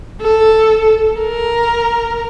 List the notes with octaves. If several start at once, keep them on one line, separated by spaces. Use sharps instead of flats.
A4
A#4